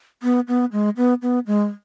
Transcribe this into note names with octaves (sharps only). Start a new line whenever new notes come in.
B3
B3
G#3
B3
B3
G#3